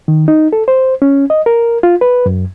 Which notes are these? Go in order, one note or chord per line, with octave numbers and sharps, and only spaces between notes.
D#3
D#4
A4
C5
C#4
D#5
A#4
F4
B4
F#2